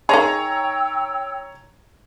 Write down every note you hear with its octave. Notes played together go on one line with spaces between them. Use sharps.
D#3 G#4 C#5 G5 A#5 E6